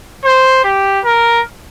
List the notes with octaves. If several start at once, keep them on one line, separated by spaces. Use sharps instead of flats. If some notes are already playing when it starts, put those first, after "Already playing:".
C5
G4
A#4